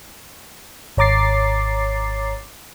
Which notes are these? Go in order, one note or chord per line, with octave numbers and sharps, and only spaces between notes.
G#1 C#5 A#5 D6 A6 C7